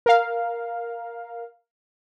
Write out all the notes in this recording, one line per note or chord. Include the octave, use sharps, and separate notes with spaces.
A#4 F5